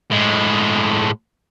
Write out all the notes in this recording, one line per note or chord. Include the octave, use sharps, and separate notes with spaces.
A2 G#3